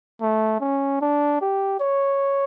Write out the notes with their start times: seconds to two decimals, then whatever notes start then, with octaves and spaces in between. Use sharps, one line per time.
0.22 A3
0.61 C#4
1.01 D4
1.42 G4
1.80 C#5